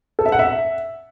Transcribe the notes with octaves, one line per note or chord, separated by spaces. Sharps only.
A4
E5
F#5
E5